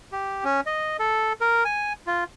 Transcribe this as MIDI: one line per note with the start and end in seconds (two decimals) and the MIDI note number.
0.12 0.44 67
0.44 0.60 61
0.66 0.97 75
0.99 1.33 69
1.41 1.64 70
1.65 1.93 80
2.07 2.24 65